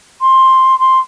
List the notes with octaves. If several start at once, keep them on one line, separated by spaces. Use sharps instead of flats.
C6
C6